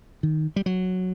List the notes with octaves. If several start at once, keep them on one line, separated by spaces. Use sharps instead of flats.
D#3
G3
F#3